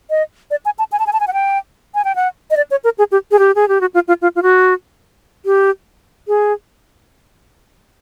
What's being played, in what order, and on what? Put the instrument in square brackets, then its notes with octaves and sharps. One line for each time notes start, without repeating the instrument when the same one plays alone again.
[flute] D#5
D5
G#5
A5
G#5
A5
G#5
A5
G#5
F#5
G5
G#5
G5
F#5
D#5
D5
C#5
A#4
G#4
G4
G#4
G4
G#4
G4
F#4
F4
F4
F4
F4
F#4
G4
G#4